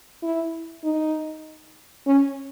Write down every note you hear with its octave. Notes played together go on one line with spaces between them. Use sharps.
E4
D#4
C#4